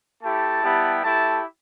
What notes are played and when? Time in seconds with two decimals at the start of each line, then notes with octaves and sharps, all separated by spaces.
0.22 A3 E4 G4 A5
0.63 G3 B3 E4 G4
1.03 A3 E4 G4 A5